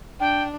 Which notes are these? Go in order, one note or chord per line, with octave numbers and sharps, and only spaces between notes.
D4 G5